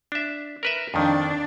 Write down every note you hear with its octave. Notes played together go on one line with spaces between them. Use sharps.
D4 E5
A#4 B4 E5
F2 D#3 D4